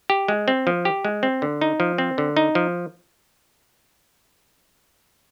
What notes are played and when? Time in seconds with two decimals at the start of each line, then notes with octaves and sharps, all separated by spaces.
0.10 G4
0.28 G#3
0.48 C4
0.67 F3
0.85 G4
1.05 G#3
1.23 C4
1.42 D3
1.61 D#4
1.80 F3
1.98 C4
2.18 D3
2.37 D#4
2.55 F3